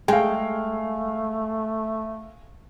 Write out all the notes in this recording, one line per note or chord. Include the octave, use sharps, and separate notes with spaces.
G#3 A3 F5 G5 G#5